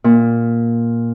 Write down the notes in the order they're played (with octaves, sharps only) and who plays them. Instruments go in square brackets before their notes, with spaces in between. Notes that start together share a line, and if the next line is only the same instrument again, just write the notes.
[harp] A#2